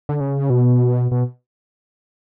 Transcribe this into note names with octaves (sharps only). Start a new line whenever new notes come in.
D3
C#3
B2
B2